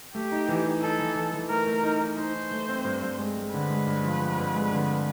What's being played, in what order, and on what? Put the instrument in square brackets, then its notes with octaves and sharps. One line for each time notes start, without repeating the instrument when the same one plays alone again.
[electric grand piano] A3 [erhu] G4
[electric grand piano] D#4
E3
D#4
[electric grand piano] D#4 [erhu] A4
[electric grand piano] E3
E3
E3
[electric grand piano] A3 [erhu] A#4
[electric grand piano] A3
D#4
D#4
[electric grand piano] D#4 [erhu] C5
[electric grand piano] D#4
A3
C4
G2
G2
G#3
G#3
[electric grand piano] D3 [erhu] B4
[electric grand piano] G#3
G2
F3
F3
G2
G#3
D3